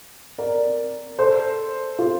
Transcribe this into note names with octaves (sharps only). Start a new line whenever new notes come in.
A#4 D5
A4 C5
F4 A4